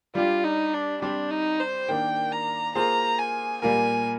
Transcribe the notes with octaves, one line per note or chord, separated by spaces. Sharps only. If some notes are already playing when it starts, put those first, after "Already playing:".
G3 D4 F4 G4
D#4
D4
G3 C4 D4 G4 C5
D#4
C5
D#3 A#3 D4 G5
A#5
A#3 F4 G#4 C5 A#5
G#5
A#2 G3 A#3 F4 A#4 G#5